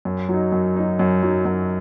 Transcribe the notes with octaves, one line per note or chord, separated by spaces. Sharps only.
F#2
F#3 D#4
F#2
F#3 D#4
F#2
F#3 D#4
F#2